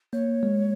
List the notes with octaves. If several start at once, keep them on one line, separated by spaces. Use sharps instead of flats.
A#3 C#5
G#3